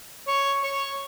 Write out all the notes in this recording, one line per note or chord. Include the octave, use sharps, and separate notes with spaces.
C#5
C#5